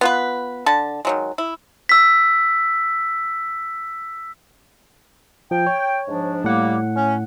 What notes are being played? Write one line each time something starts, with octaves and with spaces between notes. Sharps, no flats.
B3 F4 B4
D3 A5
D#3 F#3 G#3
E4
E6 B6
F3 G5
C#5
G#2 F3 D4
A2 G3 A#3 F#5
C#4